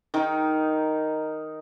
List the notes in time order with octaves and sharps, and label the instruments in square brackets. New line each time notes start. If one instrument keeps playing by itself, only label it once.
[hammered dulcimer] D#3 D#4 A#4